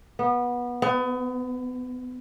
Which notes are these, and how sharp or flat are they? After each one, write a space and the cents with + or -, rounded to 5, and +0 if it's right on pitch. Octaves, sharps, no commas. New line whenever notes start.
B3 -20
B3 +30